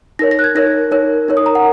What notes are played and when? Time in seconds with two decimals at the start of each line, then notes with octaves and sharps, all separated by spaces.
0.19 D#4 A#4 C#5 A#6
0.31 A#6
0.39 F#6
0.44 G#6
0.55 D#4 A#4 C#5 A#6
0.91 D#4 A#4 C#5
1.28 D#4 A#4 C#5
1.37 D#6
1.46 A#5
1.55 F#5